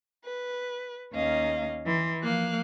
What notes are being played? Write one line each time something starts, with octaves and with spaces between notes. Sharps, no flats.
B4
D#2 A#3 C#4 D#5 F5
E3 C6
F3 A#3 F5 F#6